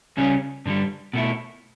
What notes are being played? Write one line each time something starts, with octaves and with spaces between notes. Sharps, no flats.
C#2 C#3 G3 C#4
G2 D3 G3
B2 A3 E4